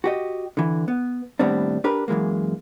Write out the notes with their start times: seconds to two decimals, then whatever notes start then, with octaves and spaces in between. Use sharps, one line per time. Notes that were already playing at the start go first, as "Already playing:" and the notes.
0.04 F#4 G4 D#5
0.57 D3 E3
0.88 B3
1.39 D#2 A2 G3 B3 C4 D4
1.84 D4 G4 A#4 B4
2.08 F#2 E3 G#3 A#3